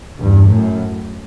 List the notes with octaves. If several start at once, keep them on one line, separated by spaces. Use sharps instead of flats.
E2 G2
F#2 A2